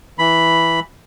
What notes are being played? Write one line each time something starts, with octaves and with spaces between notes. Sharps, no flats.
E3 B5